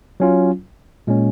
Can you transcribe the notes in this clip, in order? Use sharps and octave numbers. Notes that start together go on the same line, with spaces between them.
F#3 C#4 F4
A#2 G#3 C#4